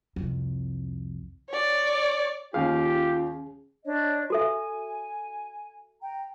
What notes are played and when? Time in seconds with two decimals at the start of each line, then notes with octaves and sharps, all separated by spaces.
0.16 C2 F2
1.49 C#5 D5
2.54 D#2 C#4 F4 G4 G#4 F5
3.85 D4 C#5 D#5
4.30 F#4 A4 E5 G#5
6.01 G5 A#5